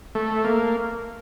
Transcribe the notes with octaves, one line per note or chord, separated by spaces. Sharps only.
A3
A#3